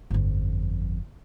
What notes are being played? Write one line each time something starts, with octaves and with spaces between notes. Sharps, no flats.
G1 F2